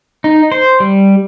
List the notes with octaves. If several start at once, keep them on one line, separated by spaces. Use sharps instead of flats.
D#4
C5
G3